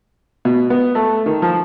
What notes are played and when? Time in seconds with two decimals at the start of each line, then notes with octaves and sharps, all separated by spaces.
0.45 B2
0.70 B3
0.95 A3
1.26 D#3
1.42 F3